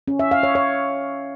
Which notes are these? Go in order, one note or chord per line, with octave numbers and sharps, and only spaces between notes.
C#4
E5
F5
C#5
C#5